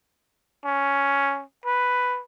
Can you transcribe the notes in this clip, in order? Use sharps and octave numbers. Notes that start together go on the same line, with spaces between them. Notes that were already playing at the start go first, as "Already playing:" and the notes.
C#4
B4